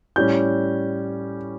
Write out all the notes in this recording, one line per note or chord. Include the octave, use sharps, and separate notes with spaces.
A2 G3 C#4 G6